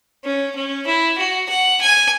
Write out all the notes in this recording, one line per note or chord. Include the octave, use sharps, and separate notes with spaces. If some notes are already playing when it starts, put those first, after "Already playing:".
C#4
C#4
E4
F#4
F#5
G#5